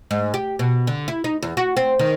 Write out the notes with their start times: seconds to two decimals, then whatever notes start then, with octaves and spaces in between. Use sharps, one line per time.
0.11 G#2
0.34 G4
0.59 B2
0.87 D3
1.08 E4
1.24 D#4
1.42 E2
1.57 F#4
1.77 C4
1.99 D#3